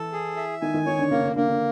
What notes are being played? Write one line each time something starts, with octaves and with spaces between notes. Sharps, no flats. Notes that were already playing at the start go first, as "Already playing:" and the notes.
Already playing: E3 A4
G#4
E5
D#3 D#4 G#5
D#3 D#4
D#3 D#4 C#5
D3 D4
C#3 A#3 C#4
D3 D4
D3 A#3 D4
D3 D4